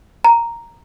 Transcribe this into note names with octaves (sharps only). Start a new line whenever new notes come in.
A#5